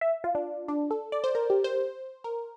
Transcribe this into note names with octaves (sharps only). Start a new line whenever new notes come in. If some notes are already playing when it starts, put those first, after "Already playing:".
E5
F4
D4
D4
A4
D5
C5
A#4
G4
C5
A#4